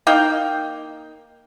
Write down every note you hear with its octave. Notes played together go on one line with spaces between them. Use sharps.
A#3 D#4 F5 G5